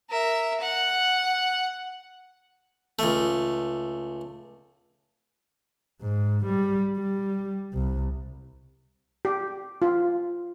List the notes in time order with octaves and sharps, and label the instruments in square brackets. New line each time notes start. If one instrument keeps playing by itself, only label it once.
[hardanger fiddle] A#4 E5
F#5
[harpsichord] C#2 A3
[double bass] G#2
G3
G3
C2
[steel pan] G4
F4